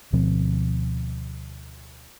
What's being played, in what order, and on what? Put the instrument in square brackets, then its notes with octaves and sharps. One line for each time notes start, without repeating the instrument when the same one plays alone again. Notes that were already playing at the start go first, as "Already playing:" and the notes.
[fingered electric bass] D2 B2 F3 C4